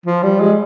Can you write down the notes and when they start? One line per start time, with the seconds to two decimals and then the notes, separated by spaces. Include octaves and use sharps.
0.06 F3
0.23 G3
0.40 G#3